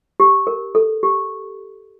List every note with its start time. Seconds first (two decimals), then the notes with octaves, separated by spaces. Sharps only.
0.20 G4
0.47 A#4
0.75 A4
1.03 G4